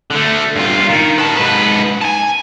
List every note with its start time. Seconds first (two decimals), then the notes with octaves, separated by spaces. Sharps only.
0.11 D3 A3
0.56 G2 F4
0.89 D#3
1.18 B4 A5
1.37 G#2 B4
2.01 G#5 A5